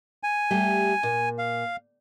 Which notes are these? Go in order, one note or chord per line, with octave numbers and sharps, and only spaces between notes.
G#5
G3 A3 G4
A#2
F5